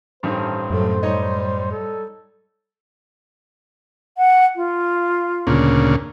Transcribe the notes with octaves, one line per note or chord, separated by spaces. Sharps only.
A1 G2 D#3 C5
F#2 A2 F#3 A3
G3 D#4 C#5 D#5
A4
F#5
F4
D2 A#2 C#3